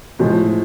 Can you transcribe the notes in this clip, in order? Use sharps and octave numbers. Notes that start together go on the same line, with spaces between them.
A2 F3 G#3